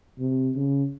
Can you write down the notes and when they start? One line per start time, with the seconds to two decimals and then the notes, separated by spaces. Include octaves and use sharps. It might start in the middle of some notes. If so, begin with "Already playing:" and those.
0.19 C3
0.55 C#3